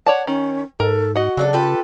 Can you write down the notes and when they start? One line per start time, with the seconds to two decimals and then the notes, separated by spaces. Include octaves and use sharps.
0.07 C#5 D5 F#5 A5
0.27 D#3 C#4
0.80 G#2 A4 A#4
1.16 F#4 D#5 F#5
1.37 C#3 F#3 D4 A4
1.53 F4 G4 A4 B4